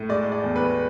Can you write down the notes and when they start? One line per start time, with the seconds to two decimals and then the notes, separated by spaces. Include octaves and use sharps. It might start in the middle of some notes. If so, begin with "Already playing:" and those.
Already playing: A2
0.09 G#3 D5
0.32 D5
0.44 E2
0.56 B4